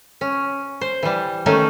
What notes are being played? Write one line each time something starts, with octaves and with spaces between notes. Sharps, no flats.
C#4
C5
E3 G3
D#3 A3 C#4 D#4